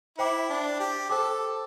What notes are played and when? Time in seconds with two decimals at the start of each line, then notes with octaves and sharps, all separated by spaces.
0.18 E4 C5 G5 D6
0.50 D4
0.80 G4
1.09 A4 C5 G5 D6